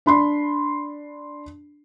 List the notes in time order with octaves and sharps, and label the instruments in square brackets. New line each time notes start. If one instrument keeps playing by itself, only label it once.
[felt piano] D4 B5 C6